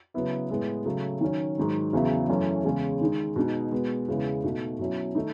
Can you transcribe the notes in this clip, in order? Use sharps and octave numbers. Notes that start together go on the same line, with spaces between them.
C#3 F#3 B3 E4
A2 G#3 B3
C#3 F#3 A3
D#3 F#3 C#4
G#2 D#3 F#3
E2 C#3 F#3 B3 E4
F#2 E3 A3 C#4 E4
E2 C#3 G#3 C#4
D#3 G#3 D#4
B2 G#3 D#4
B2 G#3 B3
E2 C#3 E3 G#3 B3
B2 A3 D#4
B2 F#3 C#4 E4
D#3 A3 D#4